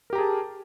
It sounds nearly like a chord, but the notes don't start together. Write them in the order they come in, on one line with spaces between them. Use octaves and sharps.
A#4 G4 A#5 G#4 A5